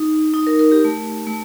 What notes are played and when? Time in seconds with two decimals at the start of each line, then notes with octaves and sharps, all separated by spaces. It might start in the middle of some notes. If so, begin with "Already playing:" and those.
Already playing: D#4
0.34 D#4
0.47 A#4
0.59 A#4
0.72 G4
0.85 A3
1.27 A3